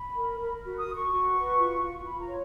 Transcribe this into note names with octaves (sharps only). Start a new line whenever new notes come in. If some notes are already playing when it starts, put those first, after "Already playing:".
Already playing: B5
A#4
A#4
F#4 B5
D#6
F#4
C#6
F#4
B4
F4
F4
F4 B5
A#5
C#5